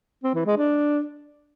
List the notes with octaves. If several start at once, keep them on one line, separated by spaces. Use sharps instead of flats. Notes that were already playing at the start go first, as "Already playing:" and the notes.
C4
E3
G#3
D4